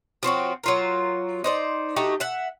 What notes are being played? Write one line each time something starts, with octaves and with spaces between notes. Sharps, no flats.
F3 C4 C#4 F#4
F#3 F4 A#4
D#4 C5 D5
A3 D#4 F#4 G4
E5 F#5